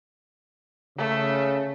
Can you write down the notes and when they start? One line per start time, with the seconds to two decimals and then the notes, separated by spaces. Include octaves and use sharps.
0.97 C#3 A3